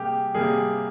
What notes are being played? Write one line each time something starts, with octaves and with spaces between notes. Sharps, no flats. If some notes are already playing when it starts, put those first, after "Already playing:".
Already playing: C3 G3 A#3 G4 G#4
C3 G3 A#3 G#4